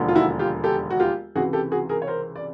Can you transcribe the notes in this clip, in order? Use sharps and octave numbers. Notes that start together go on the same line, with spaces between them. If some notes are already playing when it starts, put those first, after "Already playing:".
Already playing: E1 D#2 D3 F3
F4
E4 F#4
F4 G4
G4 A4
F#4
F4 G4
C#2 C3 E3 F#4 G#4
G4 A4
F#4 G#4
G#4 A#4
C#5
A#4 C5
D5